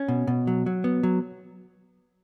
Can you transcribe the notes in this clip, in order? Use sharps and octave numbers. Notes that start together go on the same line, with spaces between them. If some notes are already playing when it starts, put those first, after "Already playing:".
Already playing: C#4
B2
B2
F#3
F#3
B3
F#3